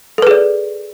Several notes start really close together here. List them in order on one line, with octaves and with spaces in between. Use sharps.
A4 B4 G#4 D5